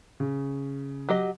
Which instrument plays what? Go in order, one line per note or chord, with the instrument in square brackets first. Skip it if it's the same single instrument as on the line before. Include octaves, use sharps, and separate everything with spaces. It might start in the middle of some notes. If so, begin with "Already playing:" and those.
[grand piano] C#3
[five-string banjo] F#3 G4 D#5